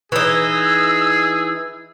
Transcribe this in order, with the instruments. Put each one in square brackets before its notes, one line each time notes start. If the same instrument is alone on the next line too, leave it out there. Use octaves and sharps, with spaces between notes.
[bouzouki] E3 D#4 [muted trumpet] G#4 [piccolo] E6